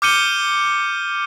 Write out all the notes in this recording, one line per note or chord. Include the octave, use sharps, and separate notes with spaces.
D6 F6 G6 C#7 D#7 G7